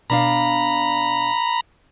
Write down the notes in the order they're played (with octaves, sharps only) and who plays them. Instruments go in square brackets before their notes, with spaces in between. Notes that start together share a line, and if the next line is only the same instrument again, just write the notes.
[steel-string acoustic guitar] B2 D4 F5 [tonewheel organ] A#5 B5